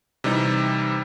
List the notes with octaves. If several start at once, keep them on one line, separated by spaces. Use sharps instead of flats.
C3 E3 G3 D#4